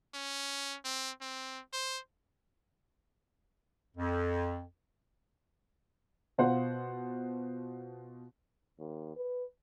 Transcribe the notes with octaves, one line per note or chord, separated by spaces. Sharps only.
C#4
C4
C4
C5
F2
B2 F4 C5 F#5
D#2
B4